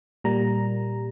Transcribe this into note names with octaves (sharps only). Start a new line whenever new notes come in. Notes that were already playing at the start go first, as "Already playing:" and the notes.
A#2 G3 A#3 A#5